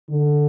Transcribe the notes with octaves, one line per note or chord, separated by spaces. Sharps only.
D3